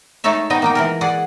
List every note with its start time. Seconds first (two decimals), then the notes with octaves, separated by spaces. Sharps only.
0.24 G#3 A3 D#4 A4 C#5 E5
0.50 B3 D#4 D#5 G5
0.62 A#3 D#4 G5
0.75 E3 G#3 A#4
1.01 G#4 D5 F#5